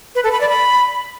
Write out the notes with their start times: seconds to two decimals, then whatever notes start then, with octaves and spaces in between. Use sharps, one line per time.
0.15 B4
0.24 A4
0.32 B5
0.41 D5
0.49 B5